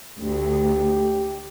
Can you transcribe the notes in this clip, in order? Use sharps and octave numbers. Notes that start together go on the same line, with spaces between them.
D2 G4